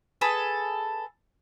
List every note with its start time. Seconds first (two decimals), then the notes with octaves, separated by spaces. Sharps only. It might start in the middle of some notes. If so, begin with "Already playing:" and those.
0.21 G#4 A4 B4